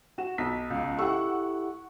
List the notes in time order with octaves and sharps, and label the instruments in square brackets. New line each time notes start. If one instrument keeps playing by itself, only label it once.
[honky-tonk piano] F#4 E7
[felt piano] B1 [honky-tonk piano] B6
[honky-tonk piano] C#2
[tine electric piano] E4 G4 A4 [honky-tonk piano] F#5 C#6 [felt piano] E6